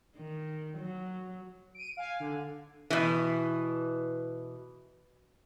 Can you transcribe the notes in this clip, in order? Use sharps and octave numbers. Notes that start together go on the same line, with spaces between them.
D#3
F#3
D7 D#7
F5 G#5
D3
B2 E3